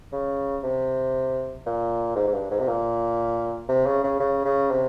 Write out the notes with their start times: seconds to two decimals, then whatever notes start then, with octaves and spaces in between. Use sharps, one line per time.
0.13 C#3
0.64 C3
1.66 A#2
2.16 G#2
2.27 G#2
2.34 G2
2.51 G#2
2.60 C3
2.68 A#2
3.69 C3
3.86 C#3
4.04 C#3
4.20 C#3
4.45 C#3
4.71 C3